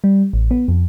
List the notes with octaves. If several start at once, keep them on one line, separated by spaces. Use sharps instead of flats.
G3
A1
B3
F2